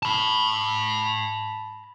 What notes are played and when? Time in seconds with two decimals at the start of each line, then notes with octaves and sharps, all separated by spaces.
0.03 A5 B5